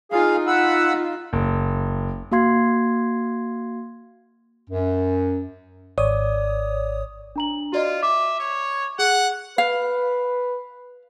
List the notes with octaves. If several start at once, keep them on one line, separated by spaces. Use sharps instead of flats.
D#4 F4 G#4 F5
F#5 B5 E6
F#1
A#3 F#4 F5 C6 G#6 C7
F#2
G#1 C#5 D5 D#6
D4 A#5 F#7
F4 F#4 D5 D#5
E5 D6
C#5
G#4 F#5
B4 F5